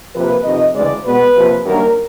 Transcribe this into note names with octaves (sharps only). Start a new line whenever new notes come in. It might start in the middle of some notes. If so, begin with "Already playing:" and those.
C3 F3 A#3 B4
F2 C3 D#3 D#5
D2 C#3 E3 G#3 D5
B2 G#3 B3 B4
C3 F3 A#3
F#2 D#3 G3 A#3 D4 A#4